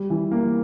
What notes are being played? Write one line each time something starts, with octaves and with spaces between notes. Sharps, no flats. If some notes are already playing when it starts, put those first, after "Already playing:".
Already playing: G3
E3
A#3